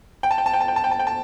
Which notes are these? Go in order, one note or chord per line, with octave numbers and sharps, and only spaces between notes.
G5
A5
G5
A5
G5
A5
G5
A5
G5
A5
G5
A5